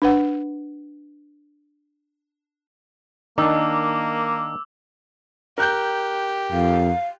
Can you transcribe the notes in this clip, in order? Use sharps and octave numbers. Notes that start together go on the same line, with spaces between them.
D4 B4 F#5
D#3 A#3 D4 D#4 D6 E6
G4 A#4 F#6 G6
F2 F5